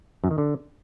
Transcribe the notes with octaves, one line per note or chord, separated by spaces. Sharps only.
F#2
D#3
D3